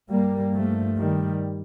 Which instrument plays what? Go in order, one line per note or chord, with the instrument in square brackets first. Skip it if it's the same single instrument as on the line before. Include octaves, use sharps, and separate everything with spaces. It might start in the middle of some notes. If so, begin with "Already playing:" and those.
[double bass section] G2 G3 A#3
F3 A3
D#3 G3